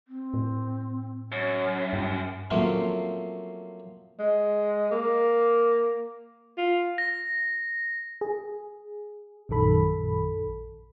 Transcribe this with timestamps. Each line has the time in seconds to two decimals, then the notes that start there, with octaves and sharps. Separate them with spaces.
0.08 C4
0.34 A2
1.32 F#2 C#5
1.93 G2 G5
2.51 F3 F#3 A3 A#3 C4 C#4
4.20 G#3
4.92 A#3
6.58 F4
6.98 A#6
8.21 G#4
9.49 A#1 F#2 D#3 A4 B5